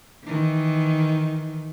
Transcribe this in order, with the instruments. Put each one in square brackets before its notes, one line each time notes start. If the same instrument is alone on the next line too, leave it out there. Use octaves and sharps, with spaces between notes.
[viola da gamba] D#3 E3